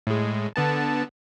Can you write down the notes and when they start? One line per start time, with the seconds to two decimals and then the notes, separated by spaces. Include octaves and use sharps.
0.07 A2 G#3
0.56 D3 B3 A5